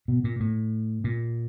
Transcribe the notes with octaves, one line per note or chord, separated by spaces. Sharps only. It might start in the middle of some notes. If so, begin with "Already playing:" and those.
B2
A#2
A2
A#2